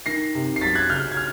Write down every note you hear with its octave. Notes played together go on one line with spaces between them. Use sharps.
D#3 A#6 C7
C3
C7
F#2 A6 B6
F#6 G#6
C#3 F6 G6
G#6
F6